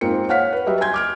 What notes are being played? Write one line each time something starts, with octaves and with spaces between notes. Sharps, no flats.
G#2 A#3 C4 F4 C#7
C#5 F5 F#5 F6 B6
B4
F#3 G3 B4 D#5 E5
G#5 C6 G6 G#6
D6 F6 D7